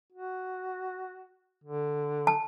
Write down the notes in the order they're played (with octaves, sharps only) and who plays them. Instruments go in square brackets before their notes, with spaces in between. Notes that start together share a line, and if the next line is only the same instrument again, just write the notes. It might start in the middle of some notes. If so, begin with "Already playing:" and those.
[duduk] F#4
D3
[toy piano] A5